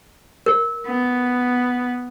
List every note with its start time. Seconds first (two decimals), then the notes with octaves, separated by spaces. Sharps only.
0.46 A#4
0.86 B3